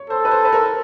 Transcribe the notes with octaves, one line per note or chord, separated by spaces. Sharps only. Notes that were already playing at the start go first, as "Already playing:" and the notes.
Already playing: C#5
A4 C5
B4
C5
B4
A#4